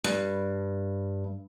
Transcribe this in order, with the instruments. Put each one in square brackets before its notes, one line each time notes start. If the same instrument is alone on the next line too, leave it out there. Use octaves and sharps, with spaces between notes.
[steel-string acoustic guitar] G2